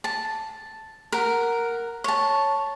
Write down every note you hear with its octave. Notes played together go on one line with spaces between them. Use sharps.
A5
A#4 F#5
C#5 A5